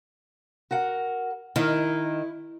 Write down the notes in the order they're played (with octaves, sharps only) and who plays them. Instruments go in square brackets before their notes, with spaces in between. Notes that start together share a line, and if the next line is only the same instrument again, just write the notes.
[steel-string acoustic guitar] F#4 A#4 F#5
[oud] D#3 [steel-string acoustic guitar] E4